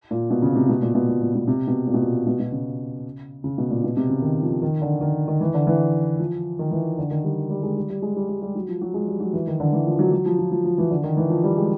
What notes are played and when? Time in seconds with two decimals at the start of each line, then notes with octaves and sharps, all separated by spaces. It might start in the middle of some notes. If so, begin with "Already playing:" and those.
0.11 A#2
0.30 B2
0.42 C#3
0.55 C3
0.69 B2
0.82 A#2
0.95 B2
1.08 A#2
1.21 A#2
1.35 B2
1.48 C3
1.67 B2
1.87 A#2
1.94 B2
2.02 A#2
2.27 B2
2.39 B2
2.52 C#3
3.44 C#3
3.58 B2
3.71 A#2
3.84 B2
3.97 C3
4.09 C#3
4.22 D#3
4.42 F3
4.62 D#3
4.82 D3
5.01 D#3
5.28 D#3
5.41 E3
5.54 D3
5.67 E3
6.19 F3
6.59 D#3
6.71 E3
6.99 D3
7.11 D#3
7.24 G3
7.50 G3
7.63 G#3
7.77 G3
7.90 G3
8.02 G#3
8.16 G3
8.29 G3
8.42 G3
8.55 F#3
8.68 F3
8.82 F#3
8.94 G#3
9.08 G3
9.20 F#3
9.33 E3
9.47 D#3
9.60 D3
9.73 E3
9.86 F3
9.99 F#3
10.12 F#3
10.26 F3
10.39 F3
10.52 F3
10.64 F3
10.78 E3
10.91 D3
11.04 D#3
11.17 E3
11.30 F3
11.44 G3
11.57 G#3